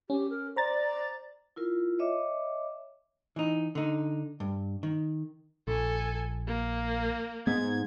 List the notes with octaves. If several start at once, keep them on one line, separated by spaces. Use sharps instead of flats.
C#4 G4
A#4
C5 D5 A#5 A6
E4 F4 A#4
C#5 D#5 E5 D6
E3 D#4
D3 D#4
G2
D#3
A#1 A4 G#5
A#3
G#2 B3 G#6